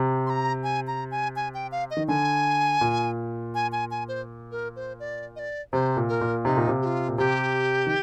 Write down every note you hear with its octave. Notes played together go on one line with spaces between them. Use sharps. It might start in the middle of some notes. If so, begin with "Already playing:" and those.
Already playing: C3
C6
A#5
G#5
A#5
G#5
G#5
G5
F5
D#5
D#3
D3 G#5
A#2
G#5
G#5
G#5
C5
A#4
C5
D5
D#5
D5
C3 C5
A#2
A#4
A#2
C3 D#4
A#2
C3
G4
F4
A#2
C3 G4
D#3